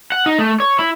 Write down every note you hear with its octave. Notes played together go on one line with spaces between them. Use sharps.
F#5
D#4
A3
C#5
E4